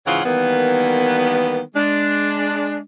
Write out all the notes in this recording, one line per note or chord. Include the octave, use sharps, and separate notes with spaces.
G#2 C#3 E3 F4 C#5 F#5
D#3 E3 G3 A#3 B3
G#3 D4